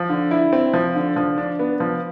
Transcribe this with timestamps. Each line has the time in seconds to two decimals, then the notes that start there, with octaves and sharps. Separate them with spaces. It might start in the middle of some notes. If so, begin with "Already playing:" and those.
Already playing: F3
0.09 D3
0.31 E4
0.53 C4
0.74 F3
0.95 D3
1.16 F3
1.38 D4
1.59 B3
1.80 F3